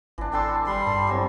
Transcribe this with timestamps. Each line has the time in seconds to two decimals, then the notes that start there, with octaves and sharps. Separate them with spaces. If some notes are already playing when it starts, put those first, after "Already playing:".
0.18 G#1 E3 D4
0.33 D4 A4 G5 A5 C6
0.67 G3 B5 C6
0.87 G2 A4
1.07 E3 F#3 C4